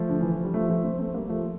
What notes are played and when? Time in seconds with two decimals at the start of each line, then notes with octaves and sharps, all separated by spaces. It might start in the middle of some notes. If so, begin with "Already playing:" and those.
Already playing: F3 A3
0.09 D3
0.21 E3
0.32 F3
0.44 G3
0.54 F3 A3
0.70 F3 A3
0.84 A3 C4
0.99 A3 C4
1.14 G3 A#3
1.29 F3 A3